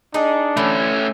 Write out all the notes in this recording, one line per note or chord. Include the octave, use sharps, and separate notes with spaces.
D4 D#4 G#4
D3 E3 A3 C#4